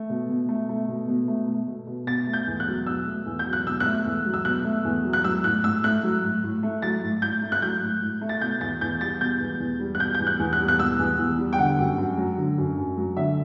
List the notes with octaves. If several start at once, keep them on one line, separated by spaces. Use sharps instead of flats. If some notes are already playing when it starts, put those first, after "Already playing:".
Already playing: A3
B2
B2
A3
A3
B2
B2
A3
A3
B2
B2
B2 A6
A3
G6
E2
F#6
F#3
B2 E6
A3
E2
G6
F#3
F#6
B2 E6
F#6
A3
E2
F#3
E6
B2 F#6
A3
E2
F#3
F#6
F#3 E6
A2 F#6
A2 E6
A3 F#6
F#3
A2
A2
A3
F#3 A6
A2
A2 G6
A3
F#6
F#3 G6
A2
A2
A3
A6
B2 G6
E2 A6
E2 G6
G3 A6
B2 G6
E2
E2
G3
F#6
B2 G6
G6
E2
F#6
E2
F#6
G3
F#6
B2 E6
E2
E2
G3
G5
D3 F#5
F#2
F#2
F#3
D3
F#2
F#2
F#3
D3 E5